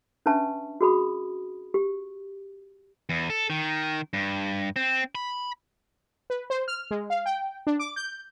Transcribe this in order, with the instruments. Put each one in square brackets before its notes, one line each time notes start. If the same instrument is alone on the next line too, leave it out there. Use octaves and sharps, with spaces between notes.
[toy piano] C#4 D4 B4 E5 A5 C#6
F#4 G#4 B5 D#6
G4
[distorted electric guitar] E2
A4
D#3
G2
C4
B5
[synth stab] B4
C5
F6
G#3
F5
G5
D4
D6
G6